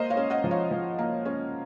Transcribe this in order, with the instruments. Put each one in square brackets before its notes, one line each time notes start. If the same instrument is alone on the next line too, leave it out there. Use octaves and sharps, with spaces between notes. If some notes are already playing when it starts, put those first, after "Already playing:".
Already playing: [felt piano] A#3 C5 D#5
C#5 F5
C#4
D#5 F#5
F3
C#5 F5
F3
A#3
C#4